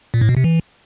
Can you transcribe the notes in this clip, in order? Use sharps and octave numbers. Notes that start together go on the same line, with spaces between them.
A#2
A2
B2
C3
E3